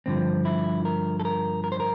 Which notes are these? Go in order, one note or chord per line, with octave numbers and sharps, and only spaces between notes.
G2 D3 F3 C4
E4
A#4
A4
A#4
A#4
C5
A#4